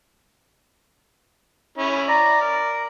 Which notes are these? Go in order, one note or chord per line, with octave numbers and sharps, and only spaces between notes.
C#4 E4
D5 A#5
A#4